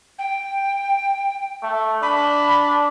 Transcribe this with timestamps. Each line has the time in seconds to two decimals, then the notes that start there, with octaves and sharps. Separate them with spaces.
0.19 G5
1.63 A3
2.02 D4 B5